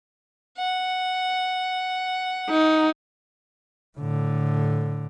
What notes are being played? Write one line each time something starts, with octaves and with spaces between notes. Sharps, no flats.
F#5
D#4
A2 D3